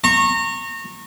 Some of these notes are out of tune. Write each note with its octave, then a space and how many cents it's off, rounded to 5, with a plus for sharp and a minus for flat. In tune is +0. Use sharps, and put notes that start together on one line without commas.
A#5 -25 C#6 -25